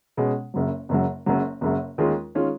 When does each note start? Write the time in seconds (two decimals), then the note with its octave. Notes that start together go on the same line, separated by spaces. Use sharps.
0.17 B2 G#3 C#4
0.54 F#1 F#2 C#3 F#3
0.89 F#1 F#2 C#3 F#3
1.26 F#1 F#2 C#3 F#3
1.61 F#1 F#2 C#3 F#3
1.98 D#2 D#3 G#3 C#4 F4
2.35 D#3 G#3 C#4 F4